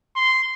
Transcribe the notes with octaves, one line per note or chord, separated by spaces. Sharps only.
C6